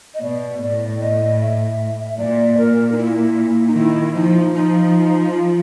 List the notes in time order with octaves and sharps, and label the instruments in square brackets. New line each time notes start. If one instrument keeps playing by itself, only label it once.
[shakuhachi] D#5
[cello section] B2 [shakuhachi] D5
[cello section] A2 [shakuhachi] D5
[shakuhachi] D#5
E5
[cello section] A#2 [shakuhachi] D5
[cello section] A#2 [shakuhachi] A#4
[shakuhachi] D#4
E4
D#4
[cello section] D#3 [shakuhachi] E4
[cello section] F3 [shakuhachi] D#4
[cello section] F3 [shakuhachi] D#4
[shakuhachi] F4